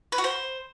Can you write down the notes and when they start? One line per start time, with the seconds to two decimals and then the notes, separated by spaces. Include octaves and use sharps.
0.12 B4
0.18 F#4
0.24 C5